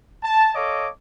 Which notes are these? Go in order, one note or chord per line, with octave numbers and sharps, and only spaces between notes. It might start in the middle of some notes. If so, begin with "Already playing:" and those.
A5
A4 C#5 D#5 F5 D6